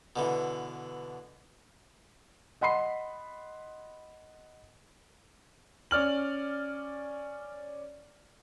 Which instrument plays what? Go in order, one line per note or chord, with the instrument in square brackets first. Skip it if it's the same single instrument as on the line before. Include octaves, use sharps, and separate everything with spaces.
[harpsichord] B2 D3 E3
[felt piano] D#5 F#5 B5 C6 C7
[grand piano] C#4 D5 F6 F#7